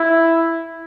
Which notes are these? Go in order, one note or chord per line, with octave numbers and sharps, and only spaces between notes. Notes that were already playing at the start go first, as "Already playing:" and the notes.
Already playing: E4